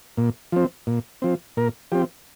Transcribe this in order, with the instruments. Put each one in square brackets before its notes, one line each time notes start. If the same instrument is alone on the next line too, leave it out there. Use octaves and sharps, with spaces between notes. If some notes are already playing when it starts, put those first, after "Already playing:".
[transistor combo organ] A#2
F3 C4
A#2
F3 C4
A#2 A#4
F3 C4 G4